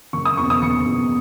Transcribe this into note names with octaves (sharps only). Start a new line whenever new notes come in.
F#1 C#6
D#6
E2 B2 C#6
D#6
F#1 C#7
E2 B2